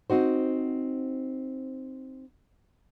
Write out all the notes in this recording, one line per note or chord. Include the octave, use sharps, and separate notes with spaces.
C4 D#4 F#4 C5